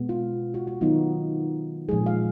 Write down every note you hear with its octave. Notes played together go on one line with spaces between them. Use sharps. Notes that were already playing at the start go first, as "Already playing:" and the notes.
Already playing: B2 G#3 B3
F4
F#4
F#4
D#3 F#3 B3 D#4 F4
A#2 F3 G#3 G#4
F5